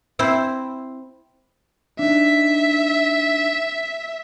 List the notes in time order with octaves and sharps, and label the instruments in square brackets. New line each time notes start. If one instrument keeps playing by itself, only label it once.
[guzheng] C4 E4 C5
[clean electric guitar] D4 D#4 [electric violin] E5